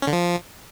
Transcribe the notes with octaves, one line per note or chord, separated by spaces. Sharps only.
C#4
D3
F3